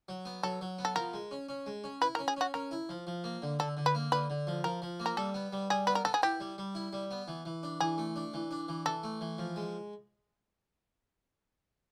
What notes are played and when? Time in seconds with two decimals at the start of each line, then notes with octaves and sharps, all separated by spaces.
0.09 F#3
0.25 B3
0.43 F#3 A4
0.61 F#3
0.79 B3
0.85 A4
0.96 F3 A#4
1.13 G#3
1.31 C#4
1.49 C#4
1.66 G#3
1.84 C#4
2.01 E4 B4
2.15 A#4
2.19 C#4
2.28 G#4
2.37 C#4 F#4
2.54 C#4 A#4
2.71 E4
2.89 F3
3.07 F3
3.24 A#3
3.42 D3
3.59 D3 A4
3.77 D3
3.86 B4
3.95 A#3
4.12 D3 B4
4.30 D3
4.47 F3
4.64 F3 A#4
4.82 F3
5.00 A#3
5.06 A#4
5.17 G3 A4
5.34 B3
5.53 G3
5.70 G3 G#4
5.87 B3 B4
5.95 A#4
6.05 B3 A4
6.14 G#4
6.23 E4 G4
6.40 G3
6.58 G3
6.75 E4
6.93 G3
7.11 B3
7.28 E3
7.45 E3
7.63 D4
7.80 E3 G#4
7.98 A3
8.16 D4
8.34 E3
8.51 D4
8.69 E3
8.86 E3 A4
9.03 A3
9.21 E3
9.38 F3
9.56 G#3